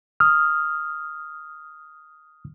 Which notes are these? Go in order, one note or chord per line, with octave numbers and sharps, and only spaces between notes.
D#6 F6